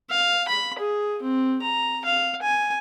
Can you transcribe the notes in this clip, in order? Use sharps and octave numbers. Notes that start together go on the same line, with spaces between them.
F5
B5
G#4
C4
A#5
F5
G#5